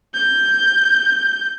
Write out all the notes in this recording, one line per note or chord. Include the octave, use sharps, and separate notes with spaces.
G6